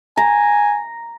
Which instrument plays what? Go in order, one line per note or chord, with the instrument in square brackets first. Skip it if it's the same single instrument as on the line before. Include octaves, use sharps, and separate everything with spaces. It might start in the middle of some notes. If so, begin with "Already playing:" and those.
[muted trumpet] G#5 [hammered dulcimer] A#5